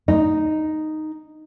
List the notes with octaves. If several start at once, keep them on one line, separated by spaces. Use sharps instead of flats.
D#4